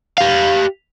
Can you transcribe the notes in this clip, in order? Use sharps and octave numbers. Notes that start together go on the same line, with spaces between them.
G4 F5